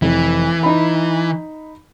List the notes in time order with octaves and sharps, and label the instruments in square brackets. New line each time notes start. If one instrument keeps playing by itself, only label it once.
[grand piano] F1 [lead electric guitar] E3
[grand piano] D#4 B5